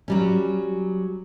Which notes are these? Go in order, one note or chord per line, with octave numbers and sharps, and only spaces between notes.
F#3 G3 C#4